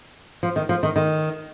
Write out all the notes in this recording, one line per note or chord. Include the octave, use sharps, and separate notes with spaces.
F3
D#3
F3
D#3
D#3